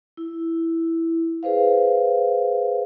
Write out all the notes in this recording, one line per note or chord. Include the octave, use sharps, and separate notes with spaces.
E4
G#4 B4 C5 F5